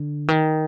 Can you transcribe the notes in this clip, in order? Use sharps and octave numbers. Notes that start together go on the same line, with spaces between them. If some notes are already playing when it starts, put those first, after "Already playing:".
Already playing: D3
D#3